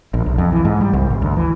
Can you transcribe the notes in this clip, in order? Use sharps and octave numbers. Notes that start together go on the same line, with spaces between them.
A#1
B1
F2
E3
G#2
G3
C2
G#1
D2
E3